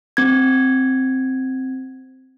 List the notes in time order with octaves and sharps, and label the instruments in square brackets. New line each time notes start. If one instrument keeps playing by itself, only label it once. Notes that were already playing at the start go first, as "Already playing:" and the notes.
[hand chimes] C4 G#6